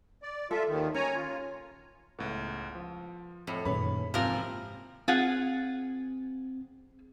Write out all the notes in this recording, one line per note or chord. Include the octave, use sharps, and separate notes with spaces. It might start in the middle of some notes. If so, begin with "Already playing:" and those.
D5
F4 A4 E5
D#2 D#3
C#4 C#5 G#5 A#5
F4
C#2 A2 B3
F3
F2 A2
F#2 A#2 D#3 C#4 G#4 B4 B5
G#2 C3 E3 F3 A#3 C4 F4 A#4
C4 F4 G#4 F#5